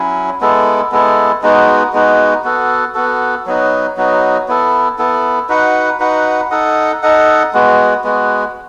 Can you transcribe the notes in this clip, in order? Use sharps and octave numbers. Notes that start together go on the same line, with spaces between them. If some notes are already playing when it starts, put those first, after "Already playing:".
Already playing: F#3 C#4 E4
G#3 B3 E4 A4
G#3 B3 E4 A4
G#3 B3 D#4 F#4
G#3 B3 D#4 F#4
B3 F#4 A4
B3 F#4 A4
F#3 B3 D#4 F#4
F#3 B3 D#4 F#4
B3 E4 A4
B3 E4 A4
D#4 F#4 B4 F#5
D#4 F#4 B4 F#5
D#4 A4 D#5 F#5
D#4 A4 D#5 F#5
G#3 B3 F#4
G#3 B3 F#4